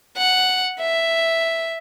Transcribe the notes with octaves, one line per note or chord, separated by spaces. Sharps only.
F#5
E5